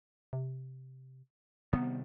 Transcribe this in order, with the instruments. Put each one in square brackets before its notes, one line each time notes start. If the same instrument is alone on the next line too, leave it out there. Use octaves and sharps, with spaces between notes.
[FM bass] C3
[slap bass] C3 D#3 G3 [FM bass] B3